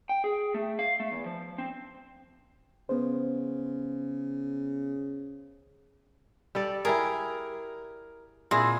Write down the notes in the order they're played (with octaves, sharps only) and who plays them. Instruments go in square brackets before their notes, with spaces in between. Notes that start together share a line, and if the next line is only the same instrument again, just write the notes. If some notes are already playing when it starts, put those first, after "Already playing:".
[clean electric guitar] G5
G#4
A3
F5
A3
E2
F3
C4
[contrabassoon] C#3 [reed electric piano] B3 C5
[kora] G3 A4 D5
[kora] E4 G4 G#4 [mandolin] A#4
[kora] A#2 E4 G#4 [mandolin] C4